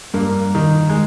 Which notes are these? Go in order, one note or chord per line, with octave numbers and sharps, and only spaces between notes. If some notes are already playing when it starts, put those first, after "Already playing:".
G2 A#3
D#3
G#3